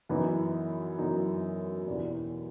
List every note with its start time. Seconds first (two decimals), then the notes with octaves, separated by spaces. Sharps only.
0.09 F#2 E3 B3 D#4
0.99 F#2 E3 B3 D#4
1.87 E2 B2 G3